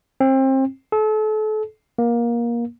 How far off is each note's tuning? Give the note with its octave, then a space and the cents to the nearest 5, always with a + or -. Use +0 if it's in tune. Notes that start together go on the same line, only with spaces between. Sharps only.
C4 +30
A4 -35
A#3 +20